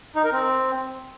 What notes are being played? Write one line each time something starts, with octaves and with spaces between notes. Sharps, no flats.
D#4
A#4
C4